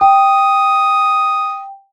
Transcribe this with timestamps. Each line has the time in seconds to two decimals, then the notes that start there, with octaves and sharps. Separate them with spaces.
0.01 G5 D#6